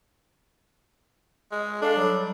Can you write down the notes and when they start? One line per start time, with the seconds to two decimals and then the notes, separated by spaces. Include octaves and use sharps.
1.52 G#3
1.82 D4 A4 F5 A5
1.95 F#3 G3